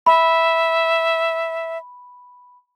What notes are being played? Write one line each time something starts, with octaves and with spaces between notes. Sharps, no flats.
E5 B5